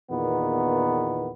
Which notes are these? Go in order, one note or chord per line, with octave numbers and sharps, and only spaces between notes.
E2 A#2 D#3 B3